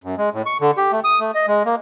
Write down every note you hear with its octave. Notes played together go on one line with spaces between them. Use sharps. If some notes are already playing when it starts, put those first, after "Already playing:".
F#2
G#3
A2
C#6
D3
G4
A3
D#6
A3
D#5
G#3
A#3